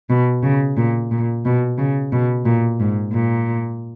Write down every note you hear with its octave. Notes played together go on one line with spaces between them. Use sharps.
B2
C#3
A#2
A#2
B2
C#3
B2
A#2
G#2
A#2